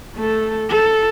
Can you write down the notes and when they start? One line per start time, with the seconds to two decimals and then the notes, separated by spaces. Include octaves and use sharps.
0.16 A3 A4
0.69 A4